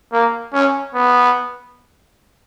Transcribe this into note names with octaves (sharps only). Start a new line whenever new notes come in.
A#3
C#4
B3